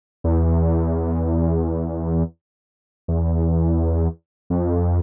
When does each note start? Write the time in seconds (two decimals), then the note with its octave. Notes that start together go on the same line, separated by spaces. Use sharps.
0.24 E2
3.08 E2
4.50 F2